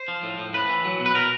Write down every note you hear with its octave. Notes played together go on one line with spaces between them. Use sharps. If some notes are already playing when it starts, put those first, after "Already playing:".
Already playing: C5
F3
A2
A2
A2 B4
E3
F#3
B2
B4
B2 A#4